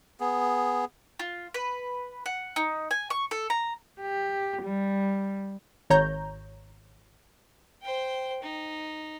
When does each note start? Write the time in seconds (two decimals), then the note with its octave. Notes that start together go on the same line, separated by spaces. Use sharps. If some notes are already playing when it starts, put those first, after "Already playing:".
0.20 B3 G#4
1.19 F4
1.54 B4
2.26 F#5
2.56 D#4
2.91 G#5
3.10 C#6
3.31 A4
3.50 A#5
4.01 G4
4.63 G3
5.90 G#1 C#5 A#5 G6
7.83 C5 G5
8.43 D#4